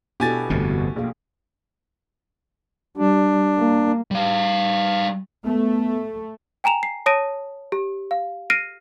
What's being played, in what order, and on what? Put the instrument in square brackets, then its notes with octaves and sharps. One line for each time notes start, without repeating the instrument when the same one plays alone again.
[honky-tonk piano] B2 [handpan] D4 E4 A4 [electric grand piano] G4 G#5 A6
[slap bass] G1 F2 C3 [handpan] A3
[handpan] F#4
[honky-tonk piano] A#1 [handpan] B2 G#4 F5
[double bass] G3 [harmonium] D4
[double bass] A#3
[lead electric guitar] G3 F5
[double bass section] A3 [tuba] B3
[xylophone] G5 G#5 A#5 E7 F7
C7
C#5 A5 D#6 A#6 D7 D#7
G4
F5
F6 A#6 C7 D7 D#7